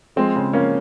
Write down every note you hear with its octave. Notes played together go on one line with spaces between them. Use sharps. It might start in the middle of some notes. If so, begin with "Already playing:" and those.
F3 G#3 C4
C#3
F3 A#3 C#4